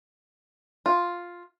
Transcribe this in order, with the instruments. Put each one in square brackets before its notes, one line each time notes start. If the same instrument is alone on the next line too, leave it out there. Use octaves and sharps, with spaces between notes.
[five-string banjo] F4